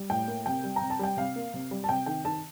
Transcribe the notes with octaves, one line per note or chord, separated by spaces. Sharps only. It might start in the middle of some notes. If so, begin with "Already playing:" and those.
Already playing: G3
A2 G5
A#3
C3 G5
G3
A#5
C3
A5
G3 G5
C3 F5
A#3
C3
G3
A5
C3 G5
D#3 G5
D#3 A5